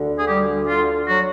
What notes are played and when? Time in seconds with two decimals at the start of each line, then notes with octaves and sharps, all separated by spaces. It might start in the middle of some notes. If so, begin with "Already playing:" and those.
Already playing: D2 D3
0.19 G#4
0.28 G3 G4
0.69 F4
1.08 F#3 F#4